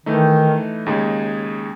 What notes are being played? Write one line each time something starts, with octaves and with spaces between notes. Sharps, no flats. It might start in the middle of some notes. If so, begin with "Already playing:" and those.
D#3 E3 A3 D#4
D#2 C#3 G#3 D#4 G#4